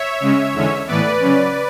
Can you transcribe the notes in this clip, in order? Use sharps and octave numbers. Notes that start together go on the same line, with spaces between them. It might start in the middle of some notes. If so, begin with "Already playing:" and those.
Already playing: C#5 E5
C#3 G#3 C#4
E2 D3 G#3 C#4
A2 E3 B3 B4 D5
C#3 F#3 C#4